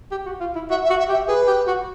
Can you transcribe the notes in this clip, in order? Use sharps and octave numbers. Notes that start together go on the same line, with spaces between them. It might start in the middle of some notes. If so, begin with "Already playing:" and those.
G4
F#4
F4
E4
F#4 E5
E5
F#4
E5
G4
E5
G#4 B4
G4
F#4